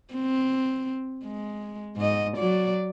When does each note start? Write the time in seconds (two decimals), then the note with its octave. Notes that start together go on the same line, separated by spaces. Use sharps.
0.14 C4
1.25 G#3
1.97 G#2 D#5
2.37 F#3 D5